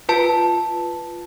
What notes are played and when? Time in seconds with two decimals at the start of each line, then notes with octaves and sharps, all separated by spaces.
0.09 F4 B4 A5